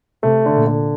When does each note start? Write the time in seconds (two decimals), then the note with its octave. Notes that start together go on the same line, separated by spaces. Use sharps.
0.23 C3 A3
0.46 D3
0.56 A#2
0.67 D3